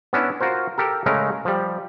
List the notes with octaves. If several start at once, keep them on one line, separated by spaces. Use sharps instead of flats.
B3 C#4 D4 E4
F4 F#4 A#4 C5
G4 A4 A#4
C#3 G#3 A3 C#4 A#4
F3 G3